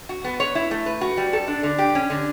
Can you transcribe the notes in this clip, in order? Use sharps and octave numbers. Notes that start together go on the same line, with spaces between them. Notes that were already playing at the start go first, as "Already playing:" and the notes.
F#4
B3
C#5
E4
A3
B4
F#4
G3
A4
D4
D3
G4
C#4
D3